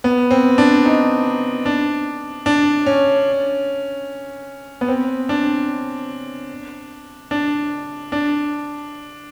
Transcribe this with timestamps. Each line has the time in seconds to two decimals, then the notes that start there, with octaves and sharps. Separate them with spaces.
0.04 B3
0.31 C4
0.58 D4
0.85 D#4
1.66 D4
2.46 D4
2.86 C#4
4.81 B3
4.88 C4
5.29 D4
7.31 D4
8.12 D4